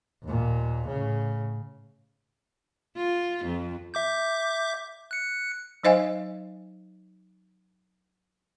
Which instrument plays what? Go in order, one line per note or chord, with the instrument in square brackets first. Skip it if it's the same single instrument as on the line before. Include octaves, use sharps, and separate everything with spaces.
[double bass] D#2 A#2
A2 C#3
[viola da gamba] F4
F2
[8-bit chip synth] E5 D6 G6
F#6 C#7
[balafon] F#3 D#4 C5 D#5 F5 G#5